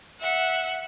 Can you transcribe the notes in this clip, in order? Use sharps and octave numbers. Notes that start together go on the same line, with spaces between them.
E5 F#5